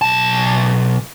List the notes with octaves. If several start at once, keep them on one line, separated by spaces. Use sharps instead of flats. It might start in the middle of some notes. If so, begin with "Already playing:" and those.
B1 A5